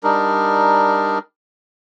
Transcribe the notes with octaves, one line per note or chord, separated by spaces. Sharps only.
G3 D4 D#4 A#4